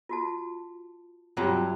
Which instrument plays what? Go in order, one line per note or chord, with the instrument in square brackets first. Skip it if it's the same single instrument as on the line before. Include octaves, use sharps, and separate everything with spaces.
[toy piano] F4 F#4 A5
[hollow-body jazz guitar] G2 C3 F#3 [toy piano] F4 F#4 C#5